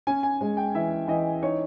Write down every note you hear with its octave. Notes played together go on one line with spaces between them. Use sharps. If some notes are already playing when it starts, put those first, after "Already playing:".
C#4 G#5
G#5
G#3
G5
E3 E5
E3 D#5
D#4 C#5